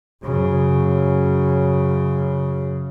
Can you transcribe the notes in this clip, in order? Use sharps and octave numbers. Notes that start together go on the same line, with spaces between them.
F#2 C#3